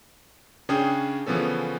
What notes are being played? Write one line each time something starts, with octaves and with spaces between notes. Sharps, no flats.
C#3 C#4 D4 G#4 G5 D#6
C#3 E3 F3 B3 C#4 A4